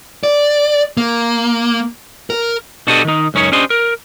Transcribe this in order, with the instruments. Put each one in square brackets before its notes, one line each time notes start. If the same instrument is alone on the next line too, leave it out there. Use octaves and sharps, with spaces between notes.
[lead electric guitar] D5
A#3
A#4
[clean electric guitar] B2 D4 F#4 G4 A4 D#5
D#3 D#4
C#2 F#2 C#4 D#4 C#5
C#4 D4 G4 C5 D#5
A#4